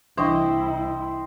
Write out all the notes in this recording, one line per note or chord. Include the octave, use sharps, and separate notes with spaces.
C2 E3 D4 E4 C5 D#5 G5 C#6